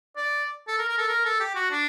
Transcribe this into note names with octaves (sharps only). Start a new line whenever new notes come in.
D5
A4
A#4
A#4
A4
A#4
A4
G4
F#4
D4